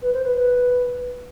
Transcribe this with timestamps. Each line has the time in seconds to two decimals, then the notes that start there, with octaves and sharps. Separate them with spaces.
0.02 B4
0.13 C5
0.24 B4
0.36 B4